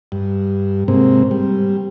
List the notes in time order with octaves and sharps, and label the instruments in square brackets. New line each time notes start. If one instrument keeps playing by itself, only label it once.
[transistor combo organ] G2
G#2 C3 A#3 C4
G3